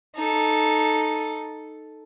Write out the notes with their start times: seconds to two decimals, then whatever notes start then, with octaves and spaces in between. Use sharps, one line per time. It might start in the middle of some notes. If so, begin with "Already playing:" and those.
0.16 D#4 A4